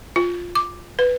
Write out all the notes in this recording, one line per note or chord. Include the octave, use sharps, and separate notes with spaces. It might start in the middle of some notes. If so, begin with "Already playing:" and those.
F4
D6
B4